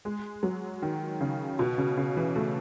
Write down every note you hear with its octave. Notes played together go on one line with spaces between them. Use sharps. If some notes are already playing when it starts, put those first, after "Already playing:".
G#3
F#3
D#3
C#3
B2
C#3
C#3
E3
A3